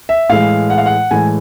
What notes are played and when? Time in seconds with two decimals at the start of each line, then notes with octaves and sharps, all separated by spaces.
0.09 E5
0.29 A2 E3 G#3 F5
0.70 F#5
0.78 F5
0.86 F#5
1.11 A2 E3 G#3 G#5